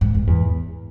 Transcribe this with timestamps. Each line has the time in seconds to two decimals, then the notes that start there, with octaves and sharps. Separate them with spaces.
0.01 G#2
0.15 G#2
0.27 E2